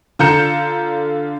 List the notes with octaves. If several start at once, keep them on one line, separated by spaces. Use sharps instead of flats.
D3 F4 A#5 G6 C#7 E7